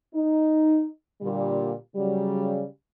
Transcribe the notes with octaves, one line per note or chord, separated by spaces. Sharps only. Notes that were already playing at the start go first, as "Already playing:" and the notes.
D#4
A#2 D3 G3
C#3 F#3 G3